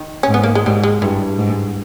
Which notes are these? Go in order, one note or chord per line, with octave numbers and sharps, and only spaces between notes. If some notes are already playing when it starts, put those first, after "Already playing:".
Already playing: D#3
C#4
G#2
B3
A#3
G#3
G#2 G3
G#3
G2 E3
G#2